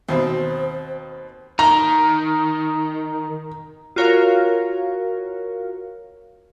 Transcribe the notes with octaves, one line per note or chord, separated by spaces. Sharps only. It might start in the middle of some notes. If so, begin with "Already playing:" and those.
D#2 B2 C4 C5
D#3 A#5
F4 F#4 A#4 C#5 F5